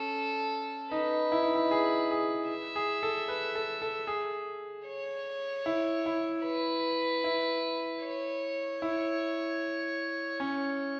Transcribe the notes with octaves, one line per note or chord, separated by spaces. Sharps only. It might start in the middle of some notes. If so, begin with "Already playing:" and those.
Already playing: C#4 A4
D#4 B4
E4
D#4
E4
G#4
G#4
E5
G#4
A4
B4
A4
A4
G#4
C#5
E4
E4
B4
E4
C#5
E4
C#4